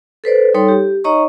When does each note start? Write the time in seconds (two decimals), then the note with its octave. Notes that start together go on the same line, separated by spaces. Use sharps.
0.24 A4 B4 C5 D5
0.54 G3 D#4 A4 C#5 G5 C6
0.69 G4
1.04 D#4 C#5 D#5 A#5 C#6